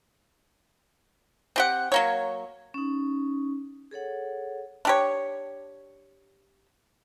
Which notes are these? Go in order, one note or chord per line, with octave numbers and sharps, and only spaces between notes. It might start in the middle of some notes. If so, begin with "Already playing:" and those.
C4 G4 F#5
F#3 A#3 C#5
C#4 D#4
G#4 A4 C#5 F#5
D4 G4 C#5